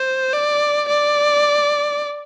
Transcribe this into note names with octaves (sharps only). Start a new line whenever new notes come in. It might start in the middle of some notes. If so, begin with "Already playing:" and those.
Already playing: C5
D5
D5